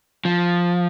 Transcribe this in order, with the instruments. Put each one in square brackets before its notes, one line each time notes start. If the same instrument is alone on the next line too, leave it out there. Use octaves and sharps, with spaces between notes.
[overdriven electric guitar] F3